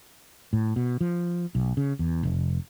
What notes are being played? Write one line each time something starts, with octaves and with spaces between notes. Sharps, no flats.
A2
B2
F3
B1
C#3
E2
F1